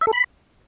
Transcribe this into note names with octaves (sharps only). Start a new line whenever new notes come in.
E5
A4
B5